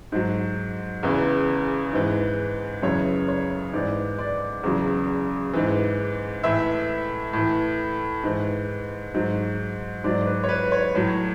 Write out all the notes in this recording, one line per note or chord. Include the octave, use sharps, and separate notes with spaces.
G#2 F#3
E2 C#3 E3
G#2 E3
F#2 C#3 E3 C#5
C#5
G#2 E3 D5
D5
E2 C#3 F#3
G#2 E3
A2 E3 E5
A2 E3
G#2 E3
G#2 F#3
G#2 F#3 D5
B4
C#5
B4
C#5
A2 F#3